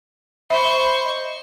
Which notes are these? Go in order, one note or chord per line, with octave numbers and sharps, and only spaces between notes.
C5 E5 B5 C#6
D#5